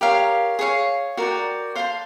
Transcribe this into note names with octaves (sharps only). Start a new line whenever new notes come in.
G4 A#4 C#5 F5
G#4 C#5 F5
F#4 A#4 D5 G5
C5 F5 A5 C6